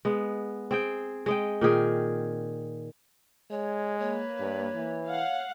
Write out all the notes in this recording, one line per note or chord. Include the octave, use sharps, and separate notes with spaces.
G#3 B3
C4 G#4 G5
G#3 D#5 G5
A#2 D#3 G#4 G5
G#3 C#5
A#3 B4 C#5
G2
E3
F5 F#5